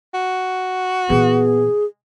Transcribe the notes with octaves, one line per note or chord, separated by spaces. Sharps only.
F#4
A#2 E3 B3 G#4